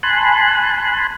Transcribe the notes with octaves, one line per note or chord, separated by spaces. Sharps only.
G#5 A5 B5 C6 F#6